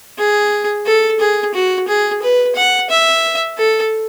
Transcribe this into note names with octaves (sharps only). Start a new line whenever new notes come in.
G#4
A4
G#4
F#4
G#4
B4
F#5
E5
A4